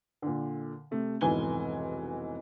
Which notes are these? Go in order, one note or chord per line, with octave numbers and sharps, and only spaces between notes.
A#2 D3
C3 A3
F1 B1 G#2 E3 G#5 G7